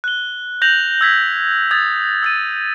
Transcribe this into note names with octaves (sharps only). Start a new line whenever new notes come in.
F#6 G7
G6 A#6 F7 F#7
E6 G#6 B6
D#6 G#6 A6
E6 A6 D#7